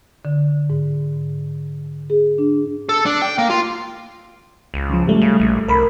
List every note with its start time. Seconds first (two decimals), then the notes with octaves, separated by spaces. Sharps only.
0.25 D3
0.70 G#2
2.10 G#4
2.38 D4
2.89 A4
3.06 D4
3.22 G5
3.38 A#3
3.50 F4
4.74 C#2
4.90 C#3 F3
5.06 G#2 G3 A3
5.21 C#3
5.40 A#1
5.68 C2 A#4 B5